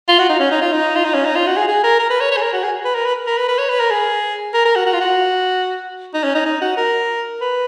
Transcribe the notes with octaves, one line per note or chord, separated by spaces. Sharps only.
F4
F#4
D#4
C#4
D#4
F4
D#4
F4
D#4
C#4
D#4
F4
F#4
G#4
G#4
A#4
A#4
B4
C#5
C#5
G#4
A#4
F#4
G#4
B4
A#4
B4
A#4
B4
B4
C#5
B4
A#4
G#4
A#4
A#4
F#4
F#4
F4
F#4
D#4
C#4
D#4
D#4
F#4
A#4
B4